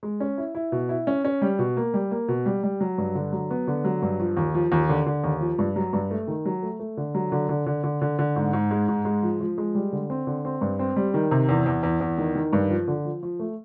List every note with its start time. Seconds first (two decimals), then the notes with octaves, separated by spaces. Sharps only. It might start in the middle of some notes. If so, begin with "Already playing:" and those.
0.03 G#3
0.20 C#4
0.38 E4
0.55 E4
0.72 B2
0.89 E4
1.07 C#4
1.25 C#4
1.42 G3
1.59 B2
1.77 A#3
1.94 G3
2.11 A#3
2.28 B2
2.46 G3
2.63 G3
2.81 F#3
2.98 G2
3.15 D3
3.32 F#3
3.50 B3
3.67 D3
3.84 F#3
4.02 G2
4.20 F3
4.37 D#2
4.54 F3
4.72 D#2
4.89 D3
5.06 D3
5.24 D#2
5.41 F3
5.59 G2
5.76 F#3
5.93 G2
6.11 A3
6.28 D#3
6.45 F#3
6.62 A3
6.79 A3
6.97 D3
7.15 F#3
7.32 D3
7.49 D3
7.66 D3
7.83 D3
8.01 D3
8.19 D3
8.36 G#2
8.53 G#2
8.71 G#3
8.88 G#2
9.05 G#3
9.23 F3
9.40 F3
9.58 G#3
9.75 G3
9.92 D3
10.10 C4
10.27 D3
10.45 C4
10.61 G2
10.79 C4
10.96 G3
11.14 D#3
11.31 C3
11.49 E2
11.66 E2
11.83 E2
12.01 E2
12.18 D#3
12.35 D#3
12.53 G2
12.70 F3
12.88 D3
13.05 F3
13.23 F3
13.39 A3